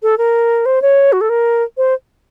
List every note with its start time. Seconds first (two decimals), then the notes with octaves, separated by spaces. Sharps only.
0.03 A4
0.18 A#4
0.66 C5
0.82 C#5
1.12 F#4
1.21 A4
1.29 A#4
1.77 C5